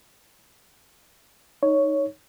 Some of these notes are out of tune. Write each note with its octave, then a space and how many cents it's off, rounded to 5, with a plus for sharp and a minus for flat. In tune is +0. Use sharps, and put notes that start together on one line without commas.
D#4 +0 C#5 +5